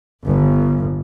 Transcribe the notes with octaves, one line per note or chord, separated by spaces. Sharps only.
G1